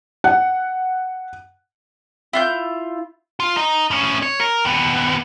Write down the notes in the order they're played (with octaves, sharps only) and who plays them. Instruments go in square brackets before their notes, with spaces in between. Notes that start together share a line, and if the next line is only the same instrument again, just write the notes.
[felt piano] F#5
[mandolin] E4 F4 G6
[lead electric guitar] F4
D#4
A2 C#4
C#5
A#4
D#2 B3